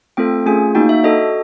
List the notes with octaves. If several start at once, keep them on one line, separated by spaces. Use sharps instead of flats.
A3 C4 F4 A4 G5
A3 C#4 F4 G#4 G#5
A#3 D#4 F#4 G5
E5
D4 F#4 A4 D#5